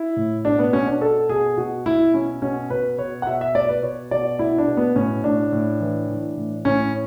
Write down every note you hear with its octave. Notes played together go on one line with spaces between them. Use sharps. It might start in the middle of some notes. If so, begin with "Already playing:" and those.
Already playing: E4
A2
B2 D4
B3
B2 C#4
D4
B2 A4
B2 G#4
B2 F#4
B2 E4
B2 C#4
B2 C#4
B2 B4
B2 C#5
F#5
B2 E5
E5
B2 D5
B4
B2 C#5
B2 D5
B2 E4
D4
B2
B3
A2 C#4
A2 D4
A2
E3
E3
A2
A2 C#4